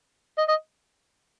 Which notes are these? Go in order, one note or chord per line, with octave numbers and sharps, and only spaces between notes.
D#5
D#5